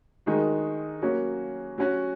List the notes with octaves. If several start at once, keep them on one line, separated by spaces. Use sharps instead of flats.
D#3 G#3 D#4 F#4
F#3 A#3 C#4 F#4
F#3 C#4 F#4